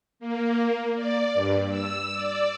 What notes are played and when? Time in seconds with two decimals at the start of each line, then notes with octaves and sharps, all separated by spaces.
0.20 A#3
0.95 D5
1.34 G2
1.68 E6
2.14 D5